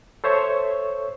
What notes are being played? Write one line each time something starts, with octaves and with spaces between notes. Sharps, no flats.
A4 C5 C#5 E5 C#6